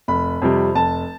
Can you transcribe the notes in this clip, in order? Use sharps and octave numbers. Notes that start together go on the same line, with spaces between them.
F1 B5
F2 C3 G3
F1 A5